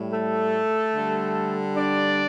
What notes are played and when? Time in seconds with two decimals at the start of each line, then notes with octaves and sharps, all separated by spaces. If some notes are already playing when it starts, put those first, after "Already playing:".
Already playing: A2 G3
0.13 A3 A4
0.94 D3 G3
1.76 D4 D5